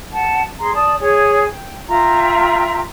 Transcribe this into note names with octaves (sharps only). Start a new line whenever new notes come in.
F#5 A5
G#4 A#5 C6
D5 A5 D#6
G#4 C#5
G5
F4 E5 G5 A#5